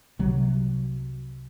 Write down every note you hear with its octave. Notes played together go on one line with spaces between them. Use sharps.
C2 C3 F#3